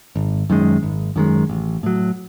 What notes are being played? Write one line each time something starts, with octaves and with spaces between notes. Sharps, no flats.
G#1
F#2 D#3 G#3
G#1
F#2 D#3 G#3
A1
A2 F#3